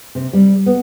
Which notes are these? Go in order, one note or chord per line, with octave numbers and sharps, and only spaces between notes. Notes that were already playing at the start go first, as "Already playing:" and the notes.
C3
G3
B3